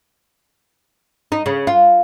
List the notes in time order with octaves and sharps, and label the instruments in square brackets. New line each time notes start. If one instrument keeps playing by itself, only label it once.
[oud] D#4
C#3
F4